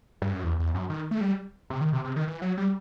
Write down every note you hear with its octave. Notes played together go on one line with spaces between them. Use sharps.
G2
F#2
E2
E2
F#2
D#3
A3
G3
C3
D#3
C3
C3
D#3
E3
F#3
G3